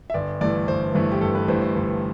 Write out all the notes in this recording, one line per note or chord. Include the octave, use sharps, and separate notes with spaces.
E5
G1 D5
G2 E3 A3 D5
G1 C5
G2 E3 A3
G4
G1 A4
B4
G2 E3 A3 C5
C5
G1